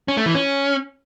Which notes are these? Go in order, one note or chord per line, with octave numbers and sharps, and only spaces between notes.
C#4
A3
E3
C#4